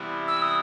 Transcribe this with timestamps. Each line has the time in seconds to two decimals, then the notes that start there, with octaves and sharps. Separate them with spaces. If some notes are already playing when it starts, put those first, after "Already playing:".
Already playing: C3 E3 G3 B3 E4
0.28 E6
0.42 D#6